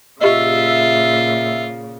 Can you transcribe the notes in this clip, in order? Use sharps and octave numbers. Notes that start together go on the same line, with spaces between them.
A#2 C#3 F4 G4 D#5 E5